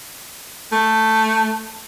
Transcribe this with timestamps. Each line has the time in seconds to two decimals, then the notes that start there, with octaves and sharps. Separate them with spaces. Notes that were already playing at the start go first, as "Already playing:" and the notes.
0.72 A3